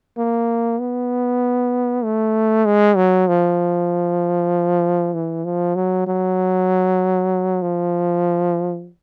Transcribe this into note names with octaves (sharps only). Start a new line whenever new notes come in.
A#3
B3
A3
G#3
F#3
F3
E3
F3
F#3
F#3
F3